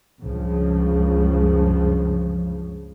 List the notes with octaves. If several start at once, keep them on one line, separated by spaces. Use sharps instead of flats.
C#2 G2 C#3 F3